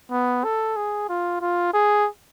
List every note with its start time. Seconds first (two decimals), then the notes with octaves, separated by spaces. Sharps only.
0.11 B3
0.44 A4
0.76 G#4
1.09 F4
1.41 F4
1.73 G#4